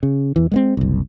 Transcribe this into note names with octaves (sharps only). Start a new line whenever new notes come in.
C#3
E2 E3
G#3 A#3 C4
F#1 C2